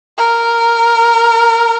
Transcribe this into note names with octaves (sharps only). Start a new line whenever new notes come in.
A#4